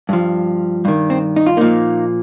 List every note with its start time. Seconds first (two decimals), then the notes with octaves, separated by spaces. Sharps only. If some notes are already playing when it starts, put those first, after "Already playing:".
0.09 G2 F3
0.85 G2 D#3
1.10 C4
1.36 D#4
1.46 F4
1.57 A#2 F3 A#3 D#4